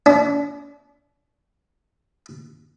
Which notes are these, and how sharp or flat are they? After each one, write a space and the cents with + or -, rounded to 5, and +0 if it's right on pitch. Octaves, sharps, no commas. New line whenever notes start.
D4 -40